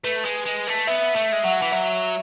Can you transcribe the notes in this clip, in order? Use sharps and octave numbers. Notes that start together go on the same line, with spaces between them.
A3 B4
G#3
G#3
A3
B3 E5
A3 E5
G#3
F#3 F#5
E3
F#3 E5